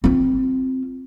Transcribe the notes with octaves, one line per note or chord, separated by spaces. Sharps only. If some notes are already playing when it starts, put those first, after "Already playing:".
C4 F4